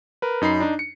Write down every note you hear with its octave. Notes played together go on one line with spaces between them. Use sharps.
A#4 B4
F#2 D#4 B5 C7
D4 D#4
C#7